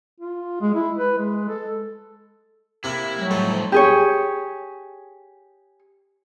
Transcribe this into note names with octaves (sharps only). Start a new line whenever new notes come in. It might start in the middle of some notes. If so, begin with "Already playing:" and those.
F4
G#3
E4
B4
G#3
A4
C3 A#3 E4
F#3 G3 A3
A2 F3 A3 D#4
C5
G4 G#4 C#5